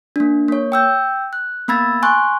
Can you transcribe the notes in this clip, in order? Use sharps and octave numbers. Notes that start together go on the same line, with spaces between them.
A#3 D4
A#3 C#5
G5 E6 G6
F#6
A#3 B3 B5 E6 G#6 A6
G#5 C6 C#6 F#6